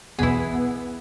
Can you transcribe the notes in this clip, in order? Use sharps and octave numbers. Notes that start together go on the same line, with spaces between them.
B1 E2 B3 E4 G#4 B6